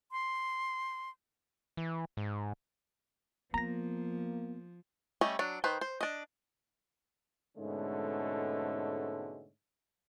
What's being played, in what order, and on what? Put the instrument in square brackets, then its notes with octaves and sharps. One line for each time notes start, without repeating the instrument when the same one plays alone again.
[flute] C6
[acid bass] E3
G#2
[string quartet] F3 [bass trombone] A#3 [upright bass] B3 [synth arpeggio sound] A#5 A#6
[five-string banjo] G3 A3 C#4 D#5
F#3 D4
D#3 B4 C5
C5
D4 D#5
[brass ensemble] G#2 B2 D3 G#3 A3 C#4